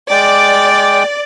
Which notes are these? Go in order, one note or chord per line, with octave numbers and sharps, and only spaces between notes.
G#3 D5 G5 D6